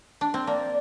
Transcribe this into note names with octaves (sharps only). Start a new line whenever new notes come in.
D4
C4
A#3 D5